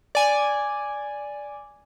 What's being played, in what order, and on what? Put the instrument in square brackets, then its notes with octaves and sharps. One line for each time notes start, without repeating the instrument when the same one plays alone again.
[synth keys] D5 G#5